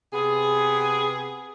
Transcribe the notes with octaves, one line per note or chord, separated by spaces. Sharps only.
C3 B3 G#4